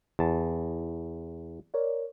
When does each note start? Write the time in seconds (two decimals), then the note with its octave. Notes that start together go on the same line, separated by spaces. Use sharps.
0.19 E2 A5
1.74 A#4 C#5 D5